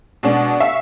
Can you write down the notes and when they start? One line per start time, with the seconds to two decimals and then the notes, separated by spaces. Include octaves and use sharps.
0.23 B2 G#3 D4
0.60 E5 F5 C#6